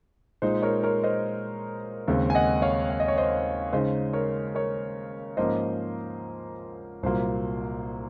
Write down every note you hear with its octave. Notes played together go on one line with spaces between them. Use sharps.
A#2 G#3 D#4 C5
A#4 C#5
A#4 C#5
C5 D#5
D#2 C#3 G#3 C4
G#5
D#5 F#5
C#5 F5
F5
D#5
C#5
C5 D#5
C#3 G#3 D#4 C5 D#5
A#4 C#5
A#4 C#5
G#2 F3 A#3 C#4 C5 D#5
C2 A#2 F#3 A#3 C5